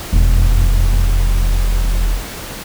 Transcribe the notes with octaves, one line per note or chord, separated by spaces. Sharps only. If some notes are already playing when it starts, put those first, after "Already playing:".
E1 F2